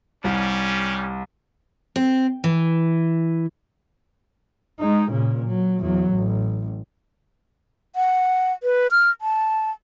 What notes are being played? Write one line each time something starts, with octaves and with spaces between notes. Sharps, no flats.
C2 G3 C#4
C4
E3
G#3 D#4
A#2 C#3
F#3
E2 F#3
A1
F#5
B4
F6
A5